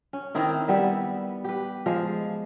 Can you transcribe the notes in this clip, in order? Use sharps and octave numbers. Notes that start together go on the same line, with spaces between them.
C#4
D#3 C4 D#4 E4
G3 B3 E5
G4 B4
F3 G#3